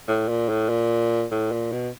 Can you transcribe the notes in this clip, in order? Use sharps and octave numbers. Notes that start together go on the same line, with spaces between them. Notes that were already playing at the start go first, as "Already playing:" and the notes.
A2
A#2
A2
A#2
A2
A#2
B2